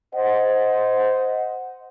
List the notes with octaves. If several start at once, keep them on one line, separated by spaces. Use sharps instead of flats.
C5 D#5 F#5